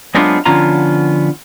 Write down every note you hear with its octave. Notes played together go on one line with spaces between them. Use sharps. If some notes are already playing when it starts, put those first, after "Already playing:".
F#3 G#3 B3 C4 D4 F4
D3 F3 B3 C#4 F4 A#5